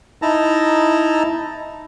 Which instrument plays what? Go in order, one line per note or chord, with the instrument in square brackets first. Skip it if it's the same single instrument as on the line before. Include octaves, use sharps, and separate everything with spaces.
[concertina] D#4 E4 A5 A#5